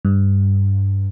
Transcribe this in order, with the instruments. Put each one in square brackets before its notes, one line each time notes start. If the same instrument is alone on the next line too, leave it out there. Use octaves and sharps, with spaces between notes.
[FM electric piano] G2